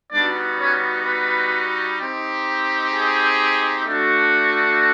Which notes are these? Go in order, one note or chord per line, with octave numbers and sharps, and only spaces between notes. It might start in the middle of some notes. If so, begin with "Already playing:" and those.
G3 B3 D4 D#4 F#4 D5
C#4 C#5
B3 B4
C4 D#4 G4
G#4
A3 D4 F#4